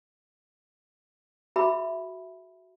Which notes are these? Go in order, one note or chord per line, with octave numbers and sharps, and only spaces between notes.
F#4 G#4 E5 B5